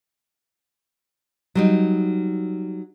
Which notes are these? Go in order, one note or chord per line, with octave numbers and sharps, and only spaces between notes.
F#3 G3 D#4